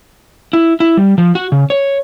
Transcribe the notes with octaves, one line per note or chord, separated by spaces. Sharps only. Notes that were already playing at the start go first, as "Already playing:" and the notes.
E4
E4
G3
F3
F#4
C#3
C#5